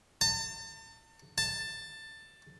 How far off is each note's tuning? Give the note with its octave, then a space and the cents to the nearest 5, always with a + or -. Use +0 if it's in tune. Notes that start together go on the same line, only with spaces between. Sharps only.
A5 +35
A5 +15